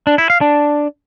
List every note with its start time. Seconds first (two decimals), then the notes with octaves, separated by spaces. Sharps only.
0.07 D4
0.18 E4
0.30 F5
0.41 D4